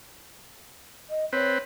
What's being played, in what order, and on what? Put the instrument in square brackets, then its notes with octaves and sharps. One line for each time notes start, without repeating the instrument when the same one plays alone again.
[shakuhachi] D#5
[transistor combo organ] C4 B4 [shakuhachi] C#5